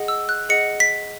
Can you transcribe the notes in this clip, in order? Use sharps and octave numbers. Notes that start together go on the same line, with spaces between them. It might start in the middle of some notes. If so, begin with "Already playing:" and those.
Already playing: G#4 D#5 F#5
E6
F#6
G#4 D#5 F#5 C#7
B6